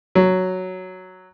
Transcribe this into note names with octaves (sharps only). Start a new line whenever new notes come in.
F#3